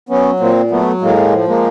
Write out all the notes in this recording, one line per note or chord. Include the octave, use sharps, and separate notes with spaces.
F#3 B3 C#4
A#2 A#3 C4
F#3 A3 B3
A2 G#3 A#3
F3
G#3 A#3